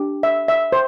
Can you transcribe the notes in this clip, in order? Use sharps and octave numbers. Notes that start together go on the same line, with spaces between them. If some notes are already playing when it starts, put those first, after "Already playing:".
Already playing: D4 G4
E5
E5
C5